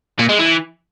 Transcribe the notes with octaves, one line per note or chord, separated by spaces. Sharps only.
A#2
G#3
E3